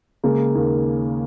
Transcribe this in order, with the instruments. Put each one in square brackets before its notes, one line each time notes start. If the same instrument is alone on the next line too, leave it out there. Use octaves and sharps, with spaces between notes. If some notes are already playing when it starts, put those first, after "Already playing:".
[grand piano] C#3 G#3 A#3
D#2